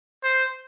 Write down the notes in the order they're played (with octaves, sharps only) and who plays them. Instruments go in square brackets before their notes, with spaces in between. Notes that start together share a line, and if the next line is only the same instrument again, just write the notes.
[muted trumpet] C5